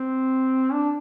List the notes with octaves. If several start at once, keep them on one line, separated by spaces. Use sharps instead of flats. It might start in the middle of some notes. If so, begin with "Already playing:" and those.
Already playing: C4
D4